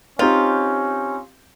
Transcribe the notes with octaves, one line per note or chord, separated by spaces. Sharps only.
C4 C#4 D#4 F4 G4